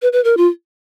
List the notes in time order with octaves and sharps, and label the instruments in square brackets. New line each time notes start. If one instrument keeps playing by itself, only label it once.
[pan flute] B4
B4
A#4
F4